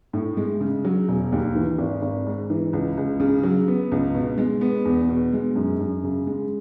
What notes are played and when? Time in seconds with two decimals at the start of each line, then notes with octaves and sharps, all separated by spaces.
0.13 A2
0.37 G#3
0.61 C#3
0.85 F#3
1.08 E1
1.32 D#2
1.55 E3
1.78 G#1
2.02 G#1
2.27 G#2
2.50 E3
2.73 C#2
2.97 C#2
3.20 C#3
3.43 F#3
3.68 B3
3.92 C#2
4.15 B2
4.38 G#3
4.61 B3
4.85 E2
5.09 B2
5.33 G#3
5.56 F#2
5.80 F#2
6.04 C#3
6.27 G#3